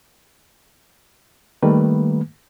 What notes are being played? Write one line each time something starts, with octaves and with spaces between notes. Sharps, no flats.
D#3 G3 A3 A#3 B4